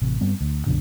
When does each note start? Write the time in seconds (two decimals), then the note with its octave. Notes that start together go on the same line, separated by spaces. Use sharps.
0.02 A1 C3
0.21 G2 G3 B3 C4
0.41 D2
0.67 C2 F#2 B2 D3